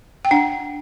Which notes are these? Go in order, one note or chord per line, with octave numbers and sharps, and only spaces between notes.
G5
D4 F#5